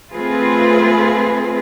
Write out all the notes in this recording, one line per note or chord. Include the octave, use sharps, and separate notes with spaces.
A3 C4 F4 G#4 B4